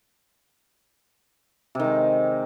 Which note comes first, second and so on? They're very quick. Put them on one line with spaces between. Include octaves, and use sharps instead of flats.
C3 D#3 G#3